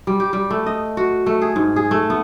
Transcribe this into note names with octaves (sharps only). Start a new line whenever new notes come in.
G3
G4
G3
A3
D#5
F#4
A3
G#4
G#2
G#4
A3
B3